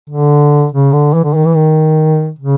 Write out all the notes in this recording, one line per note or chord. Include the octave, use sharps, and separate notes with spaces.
D3
C#3
D3
E3
D3
D#3
E3
D#3
C#3